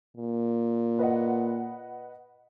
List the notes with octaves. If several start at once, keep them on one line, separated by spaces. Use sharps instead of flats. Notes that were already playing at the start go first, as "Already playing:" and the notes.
A#2
B4 D#5 F#5